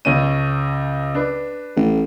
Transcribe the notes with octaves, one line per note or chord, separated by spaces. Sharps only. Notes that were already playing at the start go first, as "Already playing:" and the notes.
C#2 C#4 D#7
D4 B4
A1